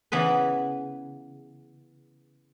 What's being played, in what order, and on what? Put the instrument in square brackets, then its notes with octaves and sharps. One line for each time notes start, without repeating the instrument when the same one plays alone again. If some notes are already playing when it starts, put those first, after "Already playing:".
[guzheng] C#3 E3 B3 B4